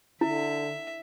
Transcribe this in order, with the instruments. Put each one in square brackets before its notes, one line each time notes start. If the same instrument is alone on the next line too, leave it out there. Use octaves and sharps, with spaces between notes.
[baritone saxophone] D3 [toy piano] E4 [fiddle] E5